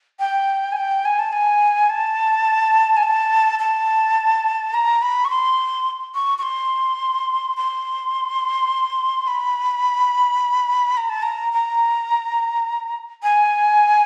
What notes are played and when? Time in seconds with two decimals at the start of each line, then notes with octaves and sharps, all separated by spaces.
0.19 G5
0.72 G#5
0.77 G5
1.05 G#5
1.19 A5
1.32 G#5
1.89 A5
2.97 G#5
3.03 A5
3.59 A5
4.74 A#5
5.02 B5
5.25 C#6
5.30 C6
6.15 C#6
6.38 C#6
6.43 C6
7.57 C6
9.27 B5
10.97 A#5
11.09 A5
11.22 A#5
11.53 A#5
13.23 G#5